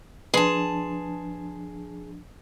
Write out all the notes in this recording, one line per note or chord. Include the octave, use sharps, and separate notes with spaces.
F3 D4 G#4 B4 A5 C6